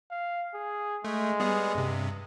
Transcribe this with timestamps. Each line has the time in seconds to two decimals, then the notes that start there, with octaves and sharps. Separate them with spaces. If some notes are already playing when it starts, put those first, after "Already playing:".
0.11 F5
0.54 G#4
1.04 G#3 A3
1.40 G3 B3 G#4
1.75 G2 C3